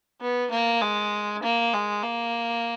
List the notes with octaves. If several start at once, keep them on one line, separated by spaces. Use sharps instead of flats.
B3
A#3
G#3
A#3
G#3
A#3